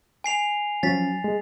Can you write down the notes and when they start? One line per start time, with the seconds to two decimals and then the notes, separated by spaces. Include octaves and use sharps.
0.24 G#5 C7 F7
0.83 F3 F#3 C#4 A6 B6
1.24 G#3